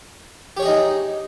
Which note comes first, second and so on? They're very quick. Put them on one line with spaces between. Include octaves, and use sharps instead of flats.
G4 C#5 G#4 D#5 D#4